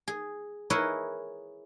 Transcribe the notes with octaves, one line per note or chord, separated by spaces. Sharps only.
G#4
E4 G#4 A#4 B4 C#5 D#5